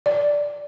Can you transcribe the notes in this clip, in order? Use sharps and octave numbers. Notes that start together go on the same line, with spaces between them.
D5